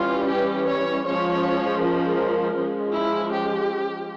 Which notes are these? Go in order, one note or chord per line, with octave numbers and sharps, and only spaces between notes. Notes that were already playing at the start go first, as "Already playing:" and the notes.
Already playing: E3 G3 C#4 F4
G4
C#5
F3 G#3 C#4 C#5
A#4
F3 G#3 C#4
E4
G4